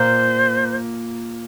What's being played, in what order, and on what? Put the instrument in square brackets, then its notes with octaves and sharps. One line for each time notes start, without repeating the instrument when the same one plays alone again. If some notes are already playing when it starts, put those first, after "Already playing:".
Already playing: [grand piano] A#2 A#3 [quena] C5